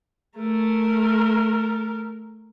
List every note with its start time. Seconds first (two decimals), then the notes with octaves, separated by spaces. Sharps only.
0.37 A3 A#4